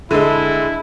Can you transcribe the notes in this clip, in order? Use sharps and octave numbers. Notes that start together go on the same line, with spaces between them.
D3 G#3 E4